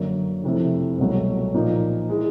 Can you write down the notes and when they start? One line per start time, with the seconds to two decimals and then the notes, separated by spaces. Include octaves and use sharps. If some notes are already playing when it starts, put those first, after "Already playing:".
Already playing: F#2 D3 F#3 A#3
0.44 F2 C3 E3 A3
0.98 C2 B2 F#3 A3
1.54 A#2 F3 A#3 D#4
2.09 E3 G#3